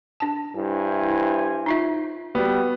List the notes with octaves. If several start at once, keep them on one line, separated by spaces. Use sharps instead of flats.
D4 A5
G2 E4 C5 G#5
D#4 F4 E5
G3 B3 F#4